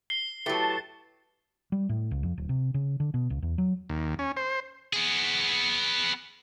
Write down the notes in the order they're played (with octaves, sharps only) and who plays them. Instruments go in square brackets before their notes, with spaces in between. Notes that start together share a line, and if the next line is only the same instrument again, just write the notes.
[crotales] C7 G7
[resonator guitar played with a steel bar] F#3 A3 [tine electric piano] E4 G4 B4 [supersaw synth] A5
[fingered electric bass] G3
A2
C#2
F2
D1
C3
C#3
D3
B2
C#2
E2
F#3
[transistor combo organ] D#2
C#4
C5
[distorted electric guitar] B3 G#4